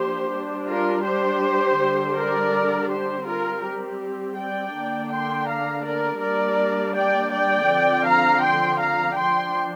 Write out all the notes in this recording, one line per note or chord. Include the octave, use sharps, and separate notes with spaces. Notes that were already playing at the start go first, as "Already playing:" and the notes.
Already playing: F3 A#3 D4 G4 C5
G3 D4
F4 A#4
G4 C5
D3 G3 D4
A#4 D5
G4 C5
G3 C4 F4 A#4
G4
D5 G5
D3 A#3 D4
G5 C6
F5 A#5
A#4 D5
G3 A#3 D4 A#4 D5
D5 G5
D5 G5
D3 F3 C4
F5 A#5
G5 C6
F5 A#5
F3 D4 G5 C6